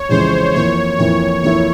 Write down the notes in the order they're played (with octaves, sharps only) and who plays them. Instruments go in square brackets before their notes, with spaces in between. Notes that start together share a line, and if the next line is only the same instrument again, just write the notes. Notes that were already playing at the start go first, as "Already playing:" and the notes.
Already playing: [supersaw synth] C#5
[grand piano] F2 C#3 E3 G#3 [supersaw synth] C5
[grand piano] F2 E3 A#3 E4 [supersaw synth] C#5
[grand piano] F2 E3 A#3 E4 [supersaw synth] C#5
[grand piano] F2 E3 A#3 E4 [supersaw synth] C#5